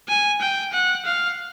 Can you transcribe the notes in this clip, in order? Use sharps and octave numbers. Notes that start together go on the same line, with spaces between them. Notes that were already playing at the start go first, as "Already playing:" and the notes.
G#5
G5
F#5
F5